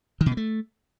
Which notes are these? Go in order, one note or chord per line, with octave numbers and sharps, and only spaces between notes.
D#3
B2
B3
A3